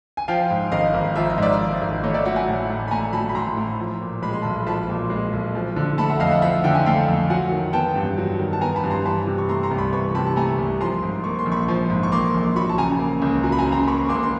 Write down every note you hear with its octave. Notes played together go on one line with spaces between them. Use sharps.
G#5
F3 F5 G5
G#2
G#1 D#5 F5
G#1
F3 E5
D#5
G#2 D5 E5
G#1
G#1
A3 C#5 D#5
D5 E5
F#3 E5 F#5
F#5 G#5
A2
A2
B5
A3 G#5 A#5
F#3 A5 B5
B5
A2 A#5 C6
A2
F3
A#2
G#3 B5
C6
B1 A5 B5
F3 A5 B5
A#2
G#3
B1
F3
D3
A3 A5 B5
E5 F#5
F2 D#5 F5
E5 F#5
F3 E5 F#5
D3 G5
G#5
A3 F5 G5
F2
F#3 F#5 G#5
D#3
B3 G5 A5
G2
F#3
D#3
A5
B3 G#5 A#5
A5 B5
G2
A#5 C6
E3 A5 B5
C3
C#6
A3 A#5 C6
A#5 C6
C2
B5 C#6
E3 B5 C#6
C3 A5 B5
A5
A3 G#5 A#5
C2
F3 A#5 C6
G#2
A#3 C#6
C6
A#1
B5 C#6
F3
G#2
C#6
A#3 C6 D6
A#1
F#3 B5 C#6
A5
C#3 G#5 A#5
A#3
C#2
F#3 G#5 A#5
B5
G#5 A#5
C#3
A#5 C6
A#3 B5 C#6
C#2 C6 D6
C6